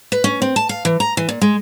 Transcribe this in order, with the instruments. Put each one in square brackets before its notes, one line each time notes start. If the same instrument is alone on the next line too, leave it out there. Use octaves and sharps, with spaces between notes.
[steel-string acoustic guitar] B4
C#4
C4
A5
F5
E3
A#5
E3
A#2
G#3